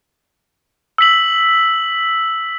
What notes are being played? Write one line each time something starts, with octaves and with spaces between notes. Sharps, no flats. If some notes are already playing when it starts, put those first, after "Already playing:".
E6 B6 F#7